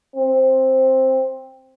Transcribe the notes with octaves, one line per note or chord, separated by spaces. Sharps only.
C4